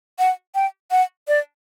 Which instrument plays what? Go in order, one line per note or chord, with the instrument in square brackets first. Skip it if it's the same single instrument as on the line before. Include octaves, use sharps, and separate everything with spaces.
[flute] F#5
G5
F#5
D5